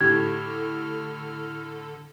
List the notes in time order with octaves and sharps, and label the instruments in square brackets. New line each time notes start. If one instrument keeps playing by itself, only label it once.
[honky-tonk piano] A2 G4 [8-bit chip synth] D3 A4 [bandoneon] F6 [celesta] G#6